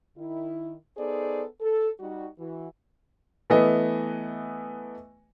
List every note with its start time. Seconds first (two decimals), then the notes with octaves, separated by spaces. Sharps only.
0.17 D#3 E4
0.97 B3 D#4 G#4 A4 C5 D5
1.60 A4
2.00 G3 D#4 F#4
2.38 E3 F#4
3.50 E3 A3 B3 D#5